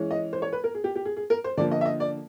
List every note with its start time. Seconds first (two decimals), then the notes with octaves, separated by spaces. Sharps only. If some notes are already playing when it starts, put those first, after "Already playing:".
Already playing: E3 G#3 C#4
0.11 D#5
0.33 C5
0.42 C#5
0.53 B4
0.64 A#4
0.75 G#4
0.84 G4
0.95 G4
1.05 G#4
1.17 G#4
1.30 A#4
1.44 C5
1.57 D3 F3 A#3 D5
1.71 D#5
1.81 E5
1.85 D#5
2.00 D5